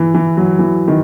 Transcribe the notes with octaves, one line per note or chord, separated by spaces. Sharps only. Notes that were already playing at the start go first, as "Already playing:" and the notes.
Already playing: E3
E3
F#3
E3
D#3